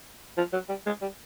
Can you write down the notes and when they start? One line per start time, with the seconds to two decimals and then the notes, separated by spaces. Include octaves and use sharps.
0.37 F3
0.53 F#3
0.69 G3
0.86 G#3
1.02 G3